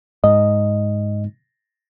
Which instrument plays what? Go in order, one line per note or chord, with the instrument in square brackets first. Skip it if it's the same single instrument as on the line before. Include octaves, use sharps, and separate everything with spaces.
[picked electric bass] G#2 [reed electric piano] D#5